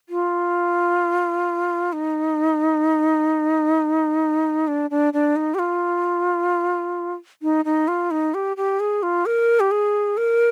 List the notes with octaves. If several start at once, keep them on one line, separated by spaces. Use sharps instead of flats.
F4
D#4
D4
D4
D4
D#4
G4
F4
D#4
D#4
F4
D#4
G4
G4
G#4
F4
A#4
G4
G#4
A#4